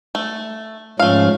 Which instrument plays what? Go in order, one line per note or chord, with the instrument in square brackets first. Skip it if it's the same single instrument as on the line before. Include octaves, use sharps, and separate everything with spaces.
[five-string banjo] A3
[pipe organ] G#2 F3 C#4 [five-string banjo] A3 F5